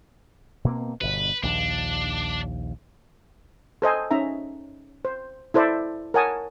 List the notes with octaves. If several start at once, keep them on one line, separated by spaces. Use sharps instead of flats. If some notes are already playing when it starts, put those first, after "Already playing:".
B2 A#3 C4
G1 B2 B4
A#1 D#2 D4
A4 C5 D#5 G#5
C#4 D#4 E5 A#5
C5
E4 A4 C5 D5 E5
A#4 C#5 F#5 G#5 A5 D#6